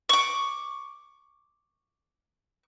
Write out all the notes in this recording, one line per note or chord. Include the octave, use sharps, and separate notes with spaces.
C#6 D6